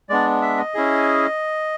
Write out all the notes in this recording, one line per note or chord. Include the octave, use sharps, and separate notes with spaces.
G#3 B3 D4 D5
E5
D#5
C#4 E4 G#4